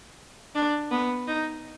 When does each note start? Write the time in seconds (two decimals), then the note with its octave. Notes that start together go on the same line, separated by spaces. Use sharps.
0.55 D4
0.91 B3
1.27 D#4